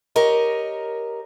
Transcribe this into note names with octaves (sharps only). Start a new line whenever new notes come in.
G4 A#4 C#5 D#5